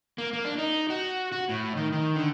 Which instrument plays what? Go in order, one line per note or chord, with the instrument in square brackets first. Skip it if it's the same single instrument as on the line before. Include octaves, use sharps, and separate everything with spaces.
[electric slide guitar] A#3
A#3
D4
D#4
F#4
F#4
A2
D#3
D#3
D3